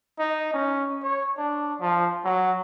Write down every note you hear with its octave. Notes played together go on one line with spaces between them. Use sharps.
D#4
C#4
C#5
D4
F3
F#3